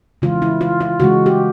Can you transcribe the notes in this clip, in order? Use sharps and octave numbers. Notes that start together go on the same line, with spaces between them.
C#3 E3 G#3 F4
E4
F4
F4
C#3 E3 G#3 F#4
G4